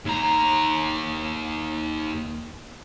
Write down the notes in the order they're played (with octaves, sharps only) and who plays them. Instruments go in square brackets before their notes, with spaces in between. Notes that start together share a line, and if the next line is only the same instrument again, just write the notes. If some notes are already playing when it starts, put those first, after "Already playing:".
[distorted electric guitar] D#2 A#5